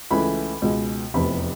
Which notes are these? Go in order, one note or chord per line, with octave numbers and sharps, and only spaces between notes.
C#2 C#3 E3 A3 B5
C#2 B2 G#3
F1 E2 C3 B5